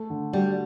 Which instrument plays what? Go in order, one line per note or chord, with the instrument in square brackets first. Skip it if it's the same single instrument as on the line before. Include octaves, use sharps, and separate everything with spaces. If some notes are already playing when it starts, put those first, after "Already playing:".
Already playing: [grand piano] A3
D3
[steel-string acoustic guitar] G3 [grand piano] F#4